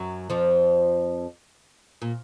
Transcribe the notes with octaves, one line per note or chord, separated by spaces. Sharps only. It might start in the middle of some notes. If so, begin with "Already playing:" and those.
Already playing: F#2 F#3
F2 F3
A#2